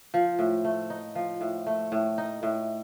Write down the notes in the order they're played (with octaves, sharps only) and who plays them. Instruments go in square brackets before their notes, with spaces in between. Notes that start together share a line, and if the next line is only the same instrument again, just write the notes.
[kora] F3
A2
A3
D#4
F3
A2
A3
A2
D#4
A2